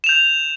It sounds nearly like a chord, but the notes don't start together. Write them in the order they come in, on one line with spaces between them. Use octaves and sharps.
E7 F7 G6